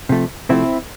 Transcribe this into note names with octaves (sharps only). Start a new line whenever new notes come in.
C3 F3 A3
C3 F3 A3 C4 E4